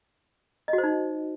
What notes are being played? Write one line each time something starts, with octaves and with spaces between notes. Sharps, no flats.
D#5
F#4
C5
D#4